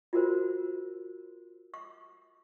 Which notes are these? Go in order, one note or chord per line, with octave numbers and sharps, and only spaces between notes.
F4 F#4 A#4 C5
C#6